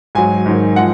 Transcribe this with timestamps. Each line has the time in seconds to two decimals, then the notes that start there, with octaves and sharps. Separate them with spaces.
0.15 G#2 F#3 G#5
0.46 G#2 D#3 F#3
0.76 F3 G#3 F#5